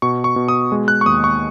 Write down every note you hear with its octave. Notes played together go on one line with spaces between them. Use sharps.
B2 C#6
C#6
B2
D#6
G#3
F#6
C#6
D#2 D#6
C#6